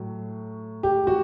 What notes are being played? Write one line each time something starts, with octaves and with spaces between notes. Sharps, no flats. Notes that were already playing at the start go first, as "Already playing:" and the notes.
Already playing: A2 F#3
G4
F#4